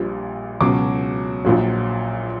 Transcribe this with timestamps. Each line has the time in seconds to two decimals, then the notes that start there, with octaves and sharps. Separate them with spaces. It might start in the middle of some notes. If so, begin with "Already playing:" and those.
Already playing: A#1 A#2 G3
0.60 C#2 B2 F#3 D6
1.45 A#1 A#2 F#3